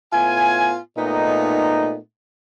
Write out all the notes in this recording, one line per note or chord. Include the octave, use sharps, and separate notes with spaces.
A2 B3 F4 G#5
A#2 A3 B3 D#4